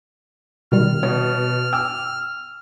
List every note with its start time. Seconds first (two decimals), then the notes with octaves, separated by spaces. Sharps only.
0.72 B2 D#3 G3 F6
1.03 B2 C#5
1.73 G5 G#5 D6 E6